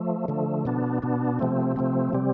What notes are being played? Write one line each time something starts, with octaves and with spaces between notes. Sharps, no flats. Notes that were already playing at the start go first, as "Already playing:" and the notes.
Already playing: F3 A3
D3 F3 A3
B2 B3 D4
B2 B3 D4
C3 F3 A3 C4
C3 F3 A3 C4
C3 G3 C4